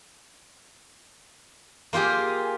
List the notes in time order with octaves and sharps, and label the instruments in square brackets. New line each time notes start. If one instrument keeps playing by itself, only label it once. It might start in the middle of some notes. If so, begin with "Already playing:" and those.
[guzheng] A#3 F4 G4 G#4